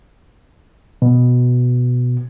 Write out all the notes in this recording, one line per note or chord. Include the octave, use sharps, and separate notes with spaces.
B2